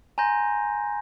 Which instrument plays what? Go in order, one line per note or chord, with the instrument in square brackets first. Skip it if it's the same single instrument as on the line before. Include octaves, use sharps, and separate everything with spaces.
[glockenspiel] G#5 A#5 C6 G6 A#6